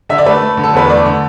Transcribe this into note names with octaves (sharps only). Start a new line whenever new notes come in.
D3 E5
D5
A3 B4
A3
D3
A4
E2 B4
A3 D5
D3